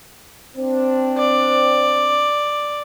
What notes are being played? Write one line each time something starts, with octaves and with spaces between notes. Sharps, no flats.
C4 D4
D5